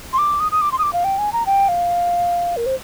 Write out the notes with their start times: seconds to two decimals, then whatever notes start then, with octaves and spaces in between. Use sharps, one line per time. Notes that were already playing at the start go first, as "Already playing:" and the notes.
0.13 C6
0.18 D6
0.40 D#6
0.51 D#6
0.61 D6
0.72 C6
0.78 D#6
0.83 D6
0.93 F5
1.04 G5
1.18 G#5
1.33 A#5
1.46 G5
1.68 F5
2.56 A#4
2.66 C5